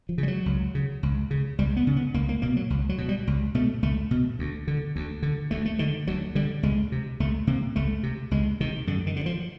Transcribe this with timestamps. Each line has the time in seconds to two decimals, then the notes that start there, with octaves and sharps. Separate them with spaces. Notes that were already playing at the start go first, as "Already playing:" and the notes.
0.09 F3
0.18 C#3
0.23 G3
0.28 F#3
0.46 C#2
0.75 C#3
1.03 C#2
1.31 C#3
1.59 C#2 G3
1.76 B3
1.87 C#3
1.96 B3
2.14 C#2 A#3
2.29 A#3
2.42 B2 A#3
2.56 F#3
2.70 C#2
2.89 F#3
2.98 B2
3.09 G3
3.27 C#2
3.55 B2 A3
3.83 C#2 A3
4.11 B2
4.39 D2
4.68 D3
4.96 D2
5.23 D3
5.51 D2 A3
5.65 A3
5.79 D3 D#3
6.07 D2 F#3
6.35 D3 G3
6.63 C#2 G#3
6.92 C3
7.20 C#2 A3
7.47 C3 A#3
7.76 C#2 A3
8.03 C3
8.31 C#2 G#3
8.60 C3 D#3
8.87 F#2 D3
9.07 D#3
9.16 D3
9.26 F3